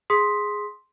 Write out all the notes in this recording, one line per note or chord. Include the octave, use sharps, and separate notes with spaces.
G#4 C6 D#6 B6